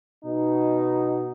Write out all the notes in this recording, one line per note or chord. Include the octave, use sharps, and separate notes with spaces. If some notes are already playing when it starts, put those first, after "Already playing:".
B2 D#4